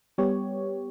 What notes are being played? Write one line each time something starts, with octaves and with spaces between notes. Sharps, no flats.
G3 B3 G4 C#5